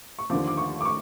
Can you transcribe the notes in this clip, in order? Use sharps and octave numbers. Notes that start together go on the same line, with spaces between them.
C#6
D#2 D3 F3 D6
D6
C#6
D6
C#6